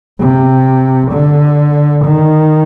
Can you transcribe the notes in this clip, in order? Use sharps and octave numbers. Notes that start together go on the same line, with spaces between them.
C3
D3
D#3